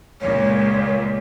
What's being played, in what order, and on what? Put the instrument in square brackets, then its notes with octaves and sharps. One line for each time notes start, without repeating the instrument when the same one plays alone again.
[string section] C#2 A#2 [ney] C#5